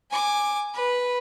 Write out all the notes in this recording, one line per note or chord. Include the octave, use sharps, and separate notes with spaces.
G#5 D6
B4